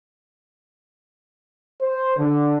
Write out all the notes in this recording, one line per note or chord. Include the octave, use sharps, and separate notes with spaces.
C5
D3